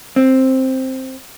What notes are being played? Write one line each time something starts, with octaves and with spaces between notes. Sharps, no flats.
C4